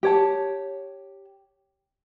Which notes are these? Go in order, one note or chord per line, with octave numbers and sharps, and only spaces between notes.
G4 C#5 A5